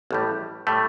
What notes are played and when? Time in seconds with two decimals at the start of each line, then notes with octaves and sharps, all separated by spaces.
0.11 A1 A2 G3
0.67 A2 G3 A3